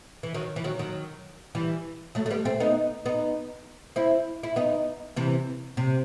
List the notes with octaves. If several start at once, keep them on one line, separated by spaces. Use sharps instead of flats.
E3
D#3 F#3
E3
D#3 F#3
D#3 F#3
E3 G3
F#3 A3
A3
G3 B3
A3 C4
B3 D#4
B3 D#4
C4 E4
E4
B3 D#4
C3 E3
C3